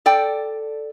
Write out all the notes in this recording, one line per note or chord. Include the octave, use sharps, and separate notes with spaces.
A4 D5 G5